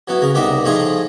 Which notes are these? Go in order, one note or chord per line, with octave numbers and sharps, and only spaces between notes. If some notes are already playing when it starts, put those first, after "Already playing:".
F#3 B3 E4
C#3 A#4
C2 G3 B3 D#4 E5 D6
A2 F3 A3 D#4 F4 G#4